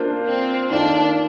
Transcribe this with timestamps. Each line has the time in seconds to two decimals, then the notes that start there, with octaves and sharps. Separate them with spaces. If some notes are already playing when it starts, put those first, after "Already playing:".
Already playing: A#3 D4 F4 C5
0.25 C4
0.70 D#3 A#3 D4 F4 A4